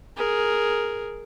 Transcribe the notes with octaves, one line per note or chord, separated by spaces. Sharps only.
G#4 A#4